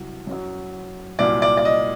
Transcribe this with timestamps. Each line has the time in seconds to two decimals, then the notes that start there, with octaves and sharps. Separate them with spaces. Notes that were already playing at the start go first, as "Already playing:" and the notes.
Already playing: C2 C3 F#3
0.27 F#2 F#3
1.19 C2 A#2 F#3 D5
1.42 D5
1.57 D5
1.65 D#5